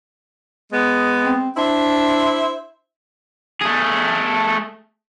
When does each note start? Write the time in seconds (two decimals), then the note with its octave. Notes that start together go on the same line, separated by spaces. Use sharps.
0.72 G#3 B3
1.24 C4
1.57 D4 E4 C5 E5
3.62 A3 G#4